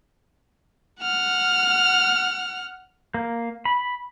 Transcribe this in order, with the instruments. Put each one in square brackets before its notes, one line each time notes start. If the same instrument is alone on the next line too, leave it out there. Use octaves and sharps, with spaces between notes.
[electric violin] F#5 F6
[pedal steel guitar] A#3
B5